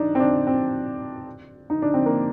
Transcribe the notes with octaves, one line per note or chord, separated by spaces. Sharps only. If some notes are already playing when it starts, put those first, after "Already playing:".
Already playing: D4 D#4
C4
D4
C4
D#4
D4
C4
A#3